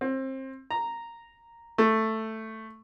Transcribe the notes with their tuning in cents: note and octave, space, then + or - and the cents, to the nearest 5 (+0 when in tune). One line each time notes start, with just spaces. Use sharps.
C4 +25
A#5 -5
A3 +5